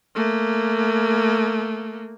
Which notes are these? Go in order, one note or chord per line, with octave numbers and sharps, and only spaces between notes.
A3 A#3